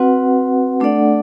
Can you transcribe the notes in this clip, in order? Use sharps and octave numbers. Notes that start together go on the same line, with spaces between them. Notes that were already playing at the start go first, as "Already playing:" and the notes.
Already playing: C4 F#4 B4 F#5
A3 D4 A4 D5 F#5